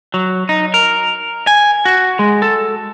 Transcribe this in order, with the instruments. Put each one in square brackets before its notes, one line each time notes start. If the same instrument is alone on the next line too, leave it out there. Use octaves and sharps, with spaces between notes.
[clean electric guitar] F#3
D#4
A#4
G#5
F#4
G#3
A4